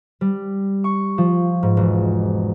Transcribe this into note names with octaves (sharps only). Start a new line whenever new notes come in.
G3
C#6
F3
G#2
E1